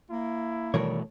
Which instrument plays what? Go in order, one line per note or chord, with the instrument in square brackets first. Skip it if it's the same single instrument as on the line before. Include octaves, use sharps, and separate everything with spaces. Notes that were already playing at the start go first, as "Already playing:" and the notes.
[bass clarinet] A#3 [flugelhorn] E4
[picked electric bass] B2 E3 A3 [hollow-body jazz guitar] D#3 A#4 C#5 [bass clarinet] G3